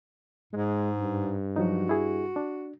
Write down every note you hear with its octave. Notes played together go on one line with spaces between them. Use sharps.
G#2 G#3
G2
F3 F#3 D#4 F#4
E4 G#4
D4